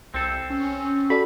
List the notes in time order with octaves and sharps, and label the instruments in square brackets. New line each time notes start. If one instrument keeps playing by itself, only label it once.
[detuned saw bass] C2 [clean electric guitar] C4 A4
[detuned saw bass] C#4
[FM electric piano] F#4 A4 D5 [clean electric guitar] B5